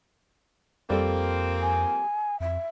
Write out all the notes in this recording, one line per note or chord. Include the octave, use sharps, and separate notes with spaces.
F2 F3 G3 A#3 C4 A4
G#5
F2 E5